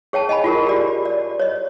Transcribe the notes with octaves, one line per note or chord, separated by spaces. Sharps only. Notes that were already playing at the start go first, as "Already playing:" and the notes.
G#4 C#5 G5 A5
D#5 G#5 A5 B5
F4 F#4 G#4 A#4
G4 D5
D5
C#5 D#5